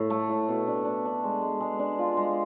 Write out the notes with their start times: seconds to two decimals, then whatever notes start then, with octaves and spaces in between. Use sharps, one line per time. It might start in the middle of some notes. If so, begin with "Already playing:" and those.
Already playing: A2
0.10 A3
0.29 A2
0.49 B2
0.67 D4
0.85 D4
1.05 D4
1.24 G#3
1.41 G#3
1.61 G#3
1.79 D4
1.99 F4
2.17 G#3